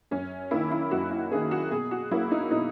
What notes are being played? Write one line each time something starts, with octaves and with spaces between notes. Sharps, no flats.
F#2 C#4
D#3 A#3 E4
E4
F#2 F#4
E4
D#3 A#3 G#4
F#4
B2 G#4
F#4
F#3 A#3 E4
D#4
B2 D#4